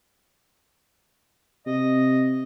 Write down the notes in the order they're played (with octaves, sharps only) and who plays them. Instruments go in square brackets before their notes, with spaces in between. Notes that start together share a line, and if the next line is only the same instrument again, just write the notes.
[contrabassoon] C3 [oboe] D#5